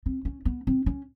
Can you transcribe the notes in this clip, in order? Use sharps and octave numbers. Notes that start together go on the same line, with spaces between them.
C4
C#4
B3
C4
C#4